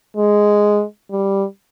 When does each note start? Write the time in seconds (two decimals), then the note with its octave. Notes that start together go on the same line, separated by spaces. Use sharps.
0.17 G#3
1.11 G3